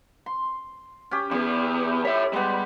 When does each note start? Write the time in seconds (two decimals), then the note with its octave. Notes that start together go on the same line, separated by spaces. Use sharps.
0.26 C6
1.11 C#4 G4
1.31 E2 B3 G4
2.05 E4 C#5 E5 B5
2.33 G3 G#3 B3